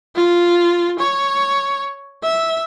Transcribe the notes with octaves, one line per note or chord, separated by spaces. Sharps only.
F4
C#5
E5